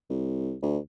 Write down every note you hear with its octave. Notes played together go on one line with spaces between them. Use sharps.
C2
D2